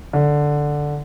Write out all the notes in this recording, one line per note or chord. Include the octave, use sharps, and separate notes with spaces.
D3